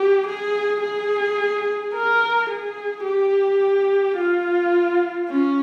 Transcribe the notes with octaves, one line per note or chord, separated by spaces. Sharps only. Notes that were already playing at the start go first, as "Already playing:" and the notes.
Already playing: G4
G#4
G#4
A#4
G#4
G4
F4
C#4